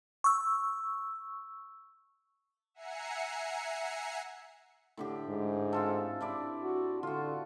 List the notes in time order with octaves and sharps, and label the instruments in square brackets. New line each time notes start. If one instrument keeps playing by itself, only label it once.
[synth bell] C#6 E6
[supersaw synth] E5 F#5 G#5 A#5 C7 C#7
[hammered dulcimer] A2 D3 G4
[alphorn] G#2
[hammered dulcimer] C4 F4 A4
D4 E4 D5
[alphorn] F#4
[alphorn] D3 [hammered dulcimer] F4 F#4